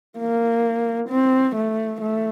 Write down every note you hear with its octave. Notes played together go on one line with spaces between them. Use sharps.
A#3
C4
A3
A3